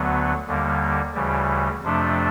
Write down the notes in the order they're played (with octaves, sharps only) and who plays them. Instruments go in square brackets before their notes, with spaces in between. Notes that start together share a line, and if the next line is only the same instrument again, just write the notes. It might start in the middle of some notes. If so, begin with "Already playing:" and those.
Already playing: [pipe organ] D2 D3 F#3 B3
D#2 D3 G3 A#3
D2 C#3 E3 G3
F2 C3 F3 A3 D4